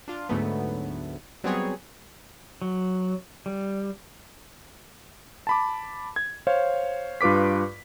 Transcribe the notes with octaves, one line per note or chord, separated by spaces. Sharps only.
D4 F4
D2 G#2 D3 F#3 A3 B3
F#3 G3 B3 C4 G#4 C#5
F#3
G3
A5 B5 D6
G#6
C5 C#5 F5
G2 F4 B4 D6 B6